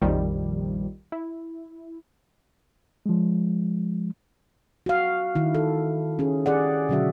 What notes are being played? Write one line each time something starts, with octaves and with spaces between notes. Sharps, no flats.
A#1 F2 D#3 F3 G3
E4
F3 G#3
F#4 F5
D#3 E4
A4
C#4 G#4
G4 G#4 D5 F#5
B2 D3 F#3 C#4 F#4 E5